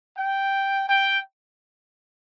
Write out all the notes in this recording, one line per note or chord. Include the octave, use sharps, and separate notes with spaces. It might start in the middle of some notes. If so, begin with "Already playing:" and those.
G5
G5